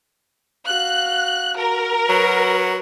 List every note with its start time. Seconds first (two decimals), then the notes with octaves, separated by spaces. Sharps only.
0.66 F#4 F5 F#6
1.56 F#4 A#4
2.10 F#3 F#4 B4